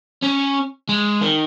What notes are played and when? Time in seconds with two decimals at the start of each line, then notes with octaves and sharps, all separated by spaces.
0.22 C#4
0.89 G#3
1.22 D#3